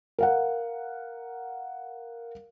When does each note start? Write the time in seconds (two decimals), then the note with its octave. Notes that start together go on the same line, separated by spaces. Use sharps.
0.19 A#4 F5 F#5